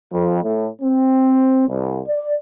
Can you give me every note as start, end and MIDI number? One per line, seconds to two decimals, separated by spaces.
0.11 0.39 41
0.42 0.67 45
0.82 1.67 60
1.68 2.00 36
2.07 2.34 74